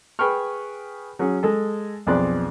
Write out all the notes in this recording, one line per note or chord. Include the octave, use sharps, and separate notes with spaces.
G#4 B4 G5 B5 C#6 F6
F#3 C#4 G#4
G#3 A4 A5
B1 F2 G#4 D5 C6 F#6